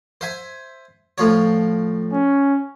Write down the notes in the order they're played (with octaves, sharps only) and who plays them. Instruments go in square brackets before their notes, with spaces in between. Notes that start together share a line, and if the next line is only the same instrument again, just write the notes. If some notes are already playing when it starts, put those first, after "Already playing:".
[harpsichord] C5 E5 G#5
A2 F3 C#5
[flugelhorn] C#4